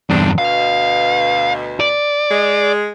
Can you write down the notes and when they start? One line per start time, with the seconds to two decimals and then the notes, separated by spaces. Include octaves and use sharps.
0.10 E2 G2 C4 D4
0.38 D2 B2 F5
1.80 D5
2.31 G#3